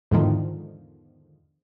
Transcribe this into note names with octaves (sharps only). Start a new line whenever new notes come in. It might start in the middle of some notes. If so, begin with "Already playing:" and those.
E2 G#2 D3 D#3 F3